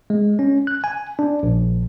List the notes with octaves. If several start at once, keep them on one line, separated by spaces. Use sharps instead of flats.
G#3
C#4
F#6
G#5
D4
A#1